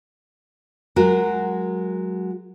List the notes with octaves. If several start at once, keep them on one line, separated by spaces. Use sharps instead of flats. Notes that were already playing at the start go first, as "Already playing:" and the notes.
F#3 G#3 F#4 A#4